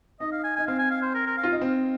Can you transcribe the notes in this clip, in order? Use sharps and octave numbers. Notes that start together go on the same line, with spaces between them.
D#4 D#5
F5
G#5
D#4 G#5
C4 F5
G#5
F5
C5
A#4
A#4
F5
F4
D#4
C4